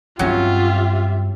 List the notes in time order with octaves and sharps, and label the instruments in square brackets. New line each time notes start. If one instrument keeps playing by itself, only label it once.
[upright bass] G2 C4 [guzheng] F#3 C#4 [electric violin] F4 [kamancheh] G4 E5